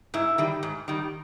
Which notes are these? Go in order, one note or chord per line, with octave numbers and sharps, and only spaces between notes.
G#2 E4
D#3 G3
G#2
D#3 G3